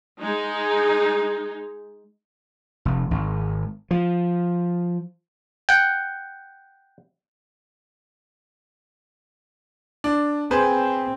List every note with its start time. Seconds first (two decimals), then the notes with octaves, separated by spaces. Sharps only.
0.20 G#3 D#4
2.85 F1
3.11 G#1
3.91 F3
5.69 F#5 G5
10.04 D4
10.51 C4 G#4 B4 C5